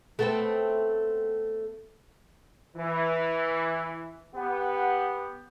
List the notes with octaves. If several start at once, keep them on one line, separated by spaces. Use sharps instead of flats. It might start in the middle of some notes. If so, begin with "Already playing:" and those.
A3 B3 C4
E3
B3 G4 F#5